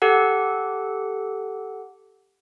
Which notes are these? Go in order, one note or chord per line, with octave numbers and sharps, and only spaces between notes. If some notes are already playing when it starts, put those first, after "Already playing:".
G4 A4 F#5